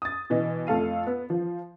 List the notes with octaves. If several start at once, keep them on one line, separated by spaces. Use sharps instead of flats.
D#6 A6
B2 E3 D#5
F2 A3 A4 F5 D#7
B3
F3